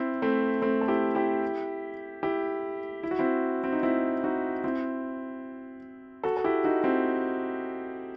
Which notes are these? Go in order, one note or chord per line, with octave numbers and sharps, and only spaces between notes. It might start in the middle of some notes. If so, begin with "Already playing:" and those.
Already playing: C4 E4
A3 C4
A3 C4
A4
E4 G4
E4 G4
E4 G4
E4
F#4
C4 E4
C4
D#4
C4 E4
D#4 F#4
C4 E4
F#4 A4
A4
E4 G4
D#4 F#4
C4 E4